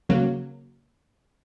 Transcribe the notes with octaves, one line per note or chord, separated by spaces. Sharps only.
C#3 F#3 A#3